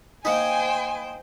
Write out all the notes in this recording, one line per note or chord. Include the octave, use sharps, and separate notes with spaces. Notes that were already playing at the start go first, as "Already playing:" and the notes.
A#3 D#4 C5 G5 G#5